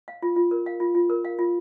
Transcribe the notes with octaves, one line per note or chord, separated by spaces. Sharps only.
F5
F4
F4
A#4
F5
F4
F4
A#4
F5
F4